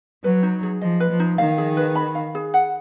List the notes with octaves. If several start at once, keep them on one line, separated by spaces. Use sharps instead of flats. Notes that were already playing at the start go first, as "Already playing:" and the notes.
F#3 B4
D#4
G#4
F3 D#5
B4
F3
D#4
D#3 F5
G#4
B4
B5
F5
G#4
F#5